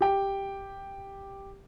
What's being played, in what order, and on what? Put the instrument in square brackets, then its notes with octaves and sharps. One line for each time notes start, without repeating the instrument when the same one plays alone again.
[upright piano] G4 G5